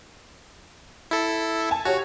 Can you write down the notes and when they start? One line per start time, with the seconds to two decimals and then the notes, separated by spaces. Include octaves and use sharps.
1.11 E4 A4
1.71 G#5 A5
1.85 F#4 G4 C#5